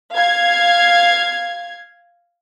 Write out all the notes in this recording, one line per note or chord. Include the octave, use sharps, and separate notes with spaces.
F5 G#6